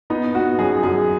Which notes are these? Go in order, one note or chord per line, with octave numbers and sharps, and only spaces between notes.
B3 D#4
B3 F#4
F#2 G#4
F#2 G#4